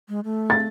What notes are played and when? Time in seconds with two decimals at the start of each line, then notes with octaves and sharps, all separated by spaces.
0.09 G#3
0.24 A3
0.50 A6